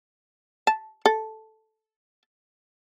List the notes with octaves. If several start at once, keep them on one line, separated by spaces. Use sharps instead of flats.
A5
A4